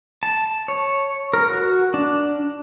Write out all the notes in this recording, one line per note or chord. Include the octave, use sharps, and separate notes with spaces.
A5
C#5
A#4
F#4
D4